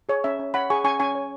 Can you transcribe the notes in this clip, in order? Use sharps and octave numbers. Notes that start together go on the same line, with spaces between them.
G#4 C#5
C#4 E5
C#4
C#5 F#5 B5
G#4 G#5 C#6
C#4 G#5 C#6
C#4 G#5 C#6
C#5